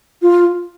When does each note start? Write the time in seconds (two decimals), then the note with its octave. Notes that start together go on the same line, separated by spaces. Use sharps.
0.22 F4